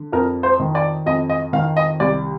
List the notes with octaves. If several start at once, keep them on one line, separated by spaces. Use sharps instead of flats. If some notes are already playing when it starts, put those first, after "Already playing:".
Already playing: D3
F2 A#4
C5
D#3
D5
F2 D#5
D#5
D#3 F5
D#5
C2 D5